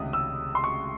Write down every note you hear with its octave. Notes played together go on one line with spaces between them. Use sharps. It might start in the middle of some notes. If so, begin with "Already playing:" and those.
Already playing: C#2 C3 D#3 A3 E5 D#6
E6
C6
C#6